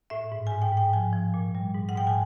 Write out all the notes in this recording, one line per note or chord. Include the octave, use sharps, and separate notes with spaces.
A2 E5
G#2
G#2 G#5
G5
G#2
G5
F3 G#5
F3
A#2
G3
G#2
F#5
G#2 G5
G#5